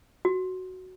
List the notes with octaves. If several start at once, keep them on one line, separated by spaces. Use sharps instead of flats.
F#4